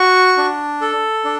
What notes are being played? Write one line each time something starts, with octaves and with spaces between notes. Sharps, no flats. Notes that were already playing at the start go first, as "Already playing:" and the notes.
Already playing: F#4 C#6
D4
A4
D4